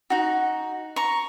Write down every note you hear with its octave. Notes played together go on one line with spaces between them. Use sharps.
D#4 F#4
A#5 C#6